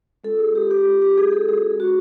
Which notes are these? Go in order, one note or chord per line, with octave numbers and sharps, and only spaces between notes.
G#3 C#4 F4 A4
G#4
G4
G4
G#3 C#4 F4 G4
G4
G#4
A4
G#3 C#4 F#4 G#4
F#4